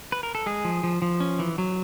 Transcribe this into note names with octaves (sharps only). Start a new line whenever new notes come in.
B4
A#4
A4
G#3 G#4
F3
F3
F3
C#4
E3
F#3